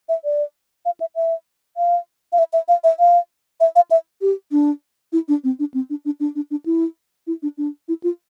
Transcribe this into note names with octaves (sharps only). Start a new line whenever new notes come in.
E5
D5
F5
E5
E5
F5
F5
E5
E5
F5
E5
F5
E5
F5
E5
G4
D4
E4
D4
C4
D4
C4
D4
D4
D4
D4
D4
E4
E4
D4
D4
E4
F4